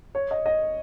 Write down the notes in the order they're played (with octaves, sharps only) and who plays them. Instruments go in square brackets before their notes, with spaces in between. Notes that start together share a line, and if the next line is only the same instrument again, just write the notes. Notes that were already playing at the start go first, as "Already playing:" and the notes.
[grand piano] C#5
D#5
D#5